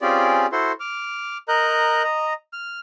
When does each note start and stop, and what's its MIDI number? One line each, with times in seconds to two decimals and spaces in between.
0.01 0.46 60
0.01 0.46 61
0.01 0.46 65
0.01 0.46 67
0.01 0.46 68
0.01 0.46 74
0.52 0.72 64
0.52 0.72 66
0.52 0.72 69
0.52 0.72 72
0.52 0.72 84
0.80 1.37 86
0.80 1.37 89
1.48 2.03 70
1.48 2.03 75
1.48 2.03 82
1.48 2.03 90
1.48 2.03 91
2.04 2.33 75
2.04 2.33 82
2.53 2.80 89